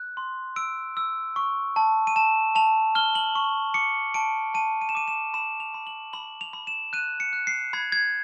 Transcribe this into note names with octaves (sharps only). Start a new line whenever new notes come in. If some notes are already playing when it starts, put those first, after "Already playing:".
Already playing: F#6
C6
E6 D7
E6
C#6
A5
D#7
A5 E7
A5 F7
F6 G7
F#7
C#6
D6 C#7
A5 D7
A5 D#7
D#7
E7
D6 D#7
E7
B5 E7
F7
B5
F#7
B5 F#7
F7
B5
E7
F#6 D#7
C#7
F#6
C7
B5 G#6
G#6